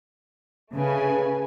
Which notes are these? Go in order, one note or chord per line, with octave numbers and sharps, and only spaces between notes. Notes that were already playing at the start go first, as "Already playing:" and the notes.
C#3 A3 B4 G#5